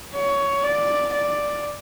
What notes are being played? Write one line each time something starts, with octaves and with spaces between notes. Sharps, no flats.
C#5
D5
D5